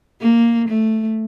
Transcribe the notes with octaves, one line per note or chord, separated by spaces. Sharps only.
A#3
A3